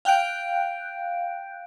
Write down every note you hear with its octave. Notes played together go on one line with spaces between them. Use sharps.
F5 G5 F#6 G6 D7